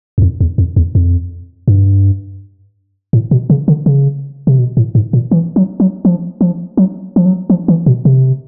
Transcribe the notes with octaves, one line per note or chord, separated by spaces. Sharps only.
E2
F2
E2
F2
E2
F2
G2
A2
B2
C#3
D3
C#3
C3
B2
A2
G#2
A#2
E3
F#3
F#3
F3
F3
F#3
F3
F#3
F3
E3
B2
C3